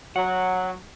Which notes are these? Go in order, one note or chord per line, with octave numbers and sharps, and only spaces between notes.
F#3 F#5